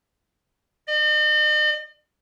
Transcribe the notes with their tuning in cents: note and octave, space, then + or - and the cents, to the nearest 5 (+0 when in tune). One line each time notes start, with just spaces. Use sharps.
D#5 -45